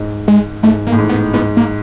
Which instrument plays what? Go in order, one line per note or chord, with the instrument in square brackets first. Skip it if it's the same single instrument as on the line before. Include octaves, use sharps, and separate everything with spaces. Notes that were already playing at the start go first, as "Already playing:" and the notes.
Already playing: [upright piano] G#2
[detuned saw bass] G#3
[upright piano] G#2 [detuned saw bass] A3
[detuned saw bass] A#3
[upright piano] A2
G#2
[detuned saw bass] B3
[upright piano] G#2 [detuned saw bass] B3
[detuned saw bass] A#3